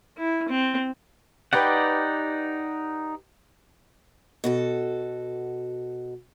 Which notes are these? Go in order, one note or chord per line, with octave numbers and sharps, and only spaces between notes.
E4
C4
D#4 G4 B4 D5 F#5 G5
B2 F#4 A4